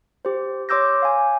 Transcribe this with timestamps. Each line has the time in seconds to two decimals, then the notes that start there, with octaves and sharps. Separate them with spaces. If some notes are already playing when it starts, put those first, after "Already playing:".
0.25 G4 C5
0.69 C#5 C6 D6 E6 G6 A#6
1.02 F5 G#5